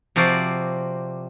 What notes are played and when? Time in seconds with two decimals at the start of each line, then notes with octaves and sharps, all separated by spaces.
0.16 C3 F3 C4 F#4 D5